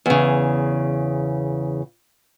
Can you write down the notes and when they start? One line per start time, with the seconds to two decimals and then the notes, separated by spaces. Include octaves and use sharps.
0.06 E2 C#3